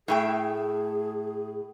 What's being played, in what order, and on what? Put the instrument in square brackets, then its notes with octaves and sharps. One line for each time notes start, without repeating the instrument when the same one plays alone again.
[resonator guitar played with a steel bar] A2 A3 G5 [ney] G#4